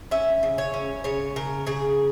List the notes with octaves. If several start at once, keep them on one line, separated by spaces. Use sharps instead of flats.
C#4 E5
C#3
C#5
C#4
C#3 C#5
C#3 A#4
C#3 G#4